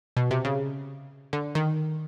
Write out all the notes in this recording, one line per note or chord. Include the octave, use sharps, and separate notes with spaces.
B2
C3
C#3
D3
D#3